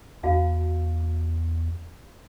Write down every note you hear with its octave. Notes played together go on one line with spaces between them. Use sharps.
E2 F#4 F5 A5